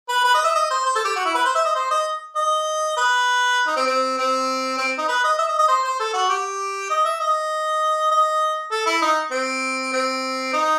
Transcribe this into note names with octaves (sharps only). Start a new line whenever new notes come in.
B4
B4
D#5
E5
D#5
C5
C5
A4
G4
F#4
E4
B4
C5
E5
D#5
C5
D#5
D#5
B4
D#4
C4
C4
C4
C4
D#4
B4
D#5
E5
D#5
D#5
C5
C5
A4
F#4
G4
D#5
E5
D#5
D#5
A4
E4
D#4
C4
C4
D#4